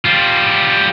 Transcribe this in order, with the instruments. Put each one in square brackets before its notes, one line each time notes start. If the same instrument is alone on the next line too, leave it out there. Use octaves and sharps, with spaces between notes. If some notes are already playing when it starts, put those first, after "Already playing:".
[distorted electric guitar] G3 F4